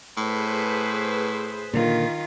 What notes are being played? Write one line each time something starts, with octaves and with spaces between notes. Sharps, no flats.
A2 G#4 B4 C5
A#2 D3 D#3 A#3 F4